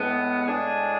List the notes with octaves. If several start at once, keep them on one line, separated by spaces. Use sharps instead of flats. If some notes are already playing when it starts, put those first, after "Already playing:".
Already playing: A2 G#3 B3
A2 G#3 D4 G#4